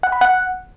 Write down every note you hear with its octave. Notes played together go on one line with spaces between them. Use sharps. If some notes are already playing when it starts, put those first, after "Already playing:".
F#5
B5
F#5